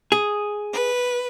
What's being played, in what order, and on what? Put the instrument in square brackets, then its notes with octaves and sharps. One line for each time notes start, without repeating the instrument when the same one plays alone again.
[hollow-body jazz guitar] G#4
[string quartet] B4